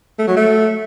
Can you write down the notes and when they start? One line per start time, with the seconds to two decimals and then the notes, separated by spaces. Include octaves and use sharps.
0.19 A3
0.28 F#3
0.36 A3